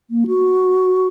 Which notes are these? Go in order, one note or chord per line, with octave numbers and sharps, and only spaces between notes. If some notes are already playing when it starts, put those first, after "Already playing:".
A#3
F#4